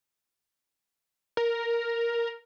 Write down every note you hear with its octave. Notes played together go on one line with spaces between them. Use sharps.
A#4